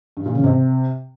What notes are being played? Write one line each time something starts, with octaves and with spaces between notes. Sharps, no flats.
G2
A#2
C#3
C3